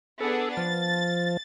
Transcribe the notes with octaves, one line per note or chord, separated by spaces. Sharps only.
B3 D4 G#4 A4
F3 A6